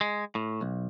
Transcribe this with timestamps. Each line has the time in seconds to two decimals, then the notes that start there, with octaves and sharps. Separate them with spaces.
0.01 G#3
0.35 A2
0.61 B1